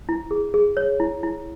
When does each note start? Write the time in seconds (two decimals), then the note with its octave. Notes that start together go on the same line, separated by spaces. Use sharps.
0.09 E4
0.31 G#4
0.54 G#4
0.77 C#5
1.00 E4
1.23 E4